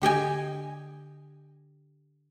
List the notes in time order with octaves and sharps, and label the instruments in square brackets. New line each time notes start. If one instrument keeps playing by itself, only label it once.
[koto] D3 G4 D#5 G#5